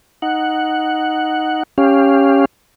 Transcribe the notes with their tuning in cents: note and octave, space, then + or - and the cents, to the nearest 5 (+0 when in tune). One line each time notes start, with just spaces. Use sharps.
D#4 +0 F#5 +0
C#4 +0 G4 +15 F5 -5